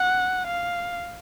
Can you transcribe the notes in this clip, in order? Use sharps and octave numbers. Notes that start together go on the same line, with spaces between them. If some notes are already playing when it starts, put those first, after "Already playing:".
Already playing: F#5
F5